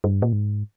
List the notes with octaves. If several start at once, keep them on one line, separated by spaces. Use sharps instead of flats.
G2
A#2
G#2